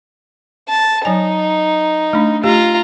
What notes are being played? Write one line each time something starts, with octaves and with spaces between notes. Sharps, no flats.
A5
F#3 D#4 C#5 G#5
A3 D4
A3 F4 G4 A#5